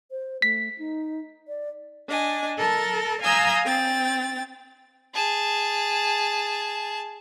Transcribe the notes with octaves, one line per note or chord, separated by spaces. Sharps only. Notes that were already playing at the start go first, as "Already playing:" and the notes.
C5
A3 B6
D#4
D5
D4 D#5 G#5
A4 A#4 A5
F5 G#5 A#5 D#6 E6 G6
C4 G5 A6
G#4 A5